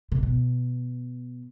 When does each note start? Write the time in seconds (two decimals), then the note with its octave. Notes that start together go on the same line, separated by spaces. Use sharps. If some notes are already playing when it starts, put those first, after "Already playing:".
0.12 C3
0.23 B2